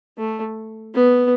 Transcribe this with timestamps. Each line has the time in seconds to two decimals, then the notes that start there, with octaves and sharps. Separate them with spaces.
0.18 A3
0.94 B3